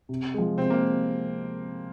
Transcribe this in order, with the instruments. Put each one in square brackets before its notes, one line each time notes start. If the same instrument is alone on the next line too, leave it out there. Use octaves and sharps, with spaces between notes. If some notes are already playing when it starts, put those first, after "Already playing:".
[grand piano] C3
F3 G#3
[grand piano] C3 [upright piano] C4
[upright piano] A#3